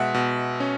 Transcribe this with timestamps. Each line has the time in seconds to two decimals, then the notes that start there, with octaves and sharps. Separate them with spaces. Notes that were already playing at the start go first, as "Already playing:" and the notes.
Already playing: B2 G#3 E5 F#5
0.14 B2
0.60 C#4